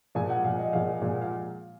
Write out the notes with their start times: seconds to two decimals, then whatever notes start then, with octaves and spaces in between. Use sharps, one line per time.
0.15 A#2 F3 G#3 G#5
0.30 F#5
0.44 A#2 F3 G#3 F5
0.59 D#5
0.73 A#2 F3 G#3 F5
1.02 A#2 F3 G#3
1.22 F5